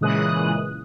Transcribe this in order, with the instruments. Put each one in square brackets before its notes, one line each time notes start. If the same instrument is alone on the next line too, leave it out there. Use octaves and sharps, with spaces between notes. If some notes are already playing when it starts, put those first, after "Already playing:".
[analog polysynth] A#2 C#3 E3 G#3 D#6 F#6